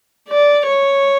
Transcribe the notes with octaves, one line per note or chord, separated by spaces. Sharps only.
D5
C#5